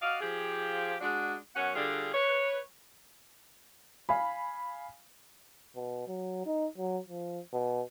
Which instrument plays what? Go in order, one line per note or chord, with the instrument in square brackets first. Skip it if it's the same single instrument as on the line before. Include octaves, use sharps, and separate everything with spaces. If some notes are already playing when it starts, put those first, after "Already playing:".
[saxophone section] F#4 D5 D#5 F5
F3 G4 G#4
G#3 D4 F#4
F#2 B3 C#4 C#5 F#5
D3 G3 D4 F4 G4 G#4
B4 C#5
[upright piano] F5 G#5 B5
[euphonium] B2
F#3
D#4
F#3
F3
B2